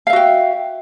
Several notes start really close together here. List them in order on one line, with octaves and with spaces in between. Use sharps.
F5 E5 F#4 G5